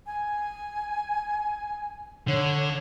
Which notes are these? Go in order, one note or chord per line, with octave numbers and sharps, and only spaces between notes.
G#5
D3 C#5